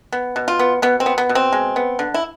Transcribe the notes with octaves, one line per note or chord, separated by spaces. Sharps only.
B3
B2
F4
B3
B2 B3
C4
B3
B3
B2
C4
G#3
B3
D3
E4